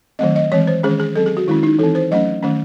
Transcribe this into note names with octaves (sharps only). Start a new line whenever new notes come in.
D#3 F#3 A3 C4 D#5
D#5
E3 G#3 C4 C#5
C5
D#3 G#3 C#4 G#4
G#4
F#3 C4 A4
G#4
F#4
D#3 G#3 C#4 E4
D#4
E3 C4 A4
C5
F#3 A3 C#4 D#5
D#3 A3 C#4